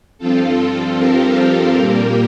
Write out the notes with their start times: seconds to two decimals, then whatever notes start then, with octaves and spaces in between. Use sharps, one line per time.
0.18 G2 F3 C4 F4 A4
0.97 G4 A#4
1.76 A#2 G3 A#3